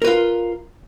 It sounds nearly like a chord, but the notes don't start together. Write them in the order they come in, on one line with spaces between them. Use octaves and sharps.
A#4 B4 F4